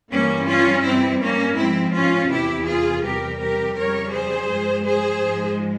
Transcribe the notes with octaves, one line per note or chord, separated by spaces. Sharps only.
G2 E3 G3 A#3 C#4
C#4 F4
G2 G3 C4 E4
A#3 C#4
G#2 F3 G#3 C4 E4
C#4 F4
E2 C3 E3 E4 G4
F4 G#4
E2 C3 G3 G4 A#4
G4 A#4
F2 C#3 G3 A#4 C#5
G#4 C5
G2 F3 G#3
G#4 C5
G#2 F3 G#3